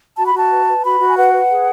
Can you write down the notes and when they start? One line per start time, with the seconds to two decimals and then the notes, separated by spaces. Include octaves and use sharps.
0.17 F#4 A5
0.27 B5
0.33 F#4 A5
0.50 B4
0.67 B4
0.83 F#4 B5
0.99 F#4
1.08 G#5
1.16 B4 F#5
1.33 B4
1.50 G#4